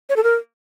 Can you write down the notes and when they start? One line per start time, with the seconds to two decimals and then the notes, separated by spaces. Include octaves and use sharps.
0.09 C#5
0.16 A4
0.24 A#4